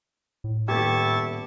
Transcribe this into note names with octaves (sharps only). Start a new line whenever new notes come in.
A2
D#1 B3 E4 G4 A5 C#6 G#6